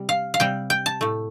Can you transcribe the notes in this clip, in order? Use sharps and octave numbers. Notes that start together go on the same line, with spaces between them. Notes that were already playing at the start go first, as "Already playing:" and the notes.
Already playing: C3 G3
F5
F5
C3 G3 G5
G5
A5
A2 A3